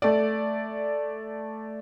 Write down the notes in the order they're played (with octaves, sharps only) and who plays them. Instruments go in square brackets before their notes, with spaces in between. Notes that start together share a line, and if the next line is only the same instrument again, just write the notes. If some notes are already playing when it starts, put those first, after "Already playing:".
[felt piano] A3 D5